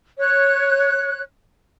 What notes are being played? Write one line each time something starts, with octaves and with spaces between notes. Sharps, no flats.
C#5 F#6